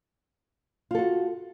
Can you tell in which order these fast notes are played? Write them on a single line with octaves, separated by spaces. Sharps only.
F4 A4 F#4